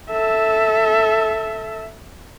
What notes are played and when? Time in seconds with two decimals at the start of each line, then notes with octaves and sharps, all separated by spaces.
0.10 A4 E5